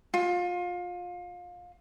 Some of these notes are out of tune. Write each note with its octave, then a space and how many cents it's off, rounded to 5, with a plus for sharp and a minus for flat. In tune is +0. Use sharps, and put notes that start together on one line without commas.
F4 +25